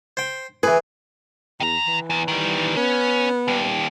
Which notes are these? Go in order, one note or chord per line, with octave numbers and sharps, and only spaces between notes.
C5 G5
E3 G#4 B4
E2 D#3 A#5
E3
E2
D#3 G3
B3 C#4
D#2 G3